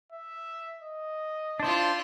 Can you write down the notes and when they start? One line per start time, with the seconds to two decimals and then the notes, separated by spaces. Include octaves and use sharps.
0.12 E5
0.83 D#5
1.60 D4 E4 F4 C5